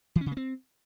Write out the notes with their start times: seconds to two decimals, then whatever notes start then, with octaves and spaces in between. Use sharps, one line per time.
0.16 E3
0.21 C#4
0.26 C#3
0.31 A#3
0.37 C4